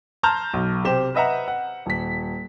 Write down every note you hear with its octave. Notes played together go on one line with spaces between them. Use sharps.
A5 A#5 C6 F6 G6
B1
C3 G4 C5 E7
B4 D#5 E5 F#5 A#5
F#5
D#1 B6